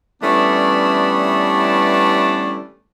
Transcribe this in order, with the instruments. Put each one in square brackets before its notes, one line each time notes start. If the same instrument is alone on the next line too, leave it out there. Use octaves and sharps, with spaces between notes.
[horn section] E3 G3 A3 B3 C#4 D4